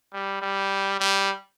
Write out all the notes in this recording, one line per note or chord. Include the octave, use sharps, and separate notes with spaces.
G3
G3
G3